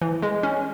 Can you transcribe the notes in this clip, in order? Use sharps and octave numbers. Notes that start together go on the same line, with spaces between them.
E3
G#3
C#4